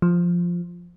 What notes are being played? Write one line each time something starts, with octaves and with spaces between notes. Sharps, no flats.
F3